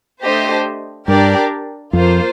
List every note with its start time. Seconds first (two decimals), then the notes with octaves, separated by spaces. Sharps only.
0.22 A3 D4 G4 C5 D#5
1.08 G2 D4 G4 A#4 D5
1.93 F2 A#3 F4 C5